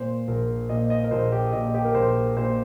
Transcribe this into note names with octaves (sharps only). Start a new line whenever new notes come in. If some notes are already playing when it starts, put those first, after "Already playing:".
Already playing: A#2 C5
A#1 A#4
A#2 D#5
D#5
A#4
A#1 C5
G4
A#2 D#5
G4
A#4
A#1 C5
A#2 C5